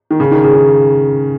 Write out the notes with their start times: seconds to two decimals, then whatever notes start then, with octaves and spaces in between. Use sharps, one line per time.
0.11 D#3
0.20 C#3
0.31 D#3
0.44 C#3
0.55 D#3